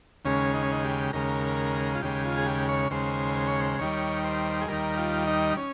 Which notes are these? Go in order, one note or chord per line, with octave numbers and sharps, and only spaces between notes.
D#2 C#3 G#3 C#4
D#4
C#4
D#4
G4
D#2 C#3 G#3 A#4
F4
D#2 C#3 G#3 G4
F4
G#4
G4
C#5
D#2 C#3 G#3 C5
C5
C#5
C5
D#2 D#3 G3 C#5
C5
G#4
D#2 D#3 G3 A#4
F4
D#4
C#4